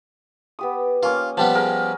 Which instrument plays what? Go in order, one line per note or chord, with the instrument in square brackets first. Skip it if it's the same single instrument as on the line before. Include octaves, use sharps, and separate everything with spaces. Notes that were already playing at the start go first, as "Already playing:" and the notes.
[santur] B3 G4 D#6
[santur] A#3 C#4 [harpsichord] F4
[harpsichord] F3 G3 B3 [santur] A5
[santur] G#4 A#4 G5